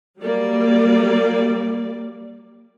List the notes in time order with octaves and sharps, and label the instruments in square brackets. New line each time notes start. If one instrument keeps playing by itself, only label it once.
[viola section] F#3 G3 A#3 D5